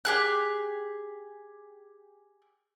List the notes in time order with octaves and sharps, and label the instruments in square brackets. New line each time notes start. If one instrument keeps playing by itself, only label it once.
[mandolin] G4 G#4 F#6